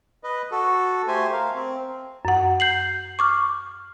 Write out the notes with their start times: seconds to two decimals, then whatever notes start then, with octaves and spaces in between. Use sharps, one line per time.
0.24 B4 D#5
0.51 F#4 A4
1.08 A3 G4 C5 G#5
1.32 A#4 F5
1.54 C4
2.25 F#2 F#5
2.60 G6 C7 F#7
3.19 C#6 D6 F6